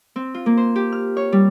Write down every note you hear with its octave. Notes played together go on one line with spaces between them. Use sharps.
C4
F4
A#3
C5
G4
F6
C#5
G3